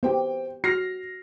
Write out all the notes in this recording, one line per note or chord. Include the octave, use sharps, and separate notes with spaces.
B3 G4 C5 G5
F#4 F6 A#6 C7